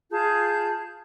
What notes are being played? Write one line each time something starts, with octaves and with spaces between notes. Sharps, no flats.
F4 G#4 A5 G6